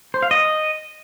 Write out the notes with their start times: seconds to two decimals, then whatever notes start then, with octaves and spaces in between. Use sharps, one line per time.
0.14 C5
0.23 F5
0.31 D#5